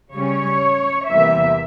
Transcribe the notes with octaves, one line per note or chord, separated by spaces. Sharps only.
C#3 G3 C#4 C#5
E2 C3 E3 G3 A#3 E5